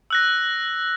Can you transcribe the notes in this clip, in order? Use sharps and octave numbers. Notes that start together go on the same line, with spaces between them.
E6 F#6 A#6